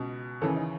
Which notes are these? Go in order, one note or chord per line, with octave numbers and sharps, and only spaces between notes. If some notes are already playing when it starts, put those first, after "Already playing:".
Already playing: C#2 B2
D#2 C#3 E3 A4
D#4